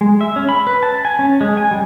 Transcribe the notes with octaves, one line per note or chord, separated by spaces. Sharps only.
G#3
E5
C#4
B5
B4
A5
G#5
C#4
G#3
G#5
G3